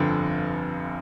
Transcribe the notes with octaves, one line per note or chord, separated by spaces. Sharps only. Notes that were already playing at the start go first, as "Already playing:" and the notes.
Already playing: G1 F2 D3